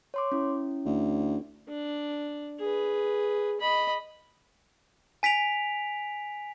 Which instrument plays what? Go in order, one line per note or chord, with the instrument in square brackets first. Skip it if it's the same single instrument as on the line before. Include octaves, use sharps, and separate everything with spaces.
[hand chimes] C#5 C6 D6
C#4 E4
[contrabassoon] D2
[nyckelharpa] D4
G#4 B4
D#5 B5
[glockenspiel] G#5 B6 D7 F7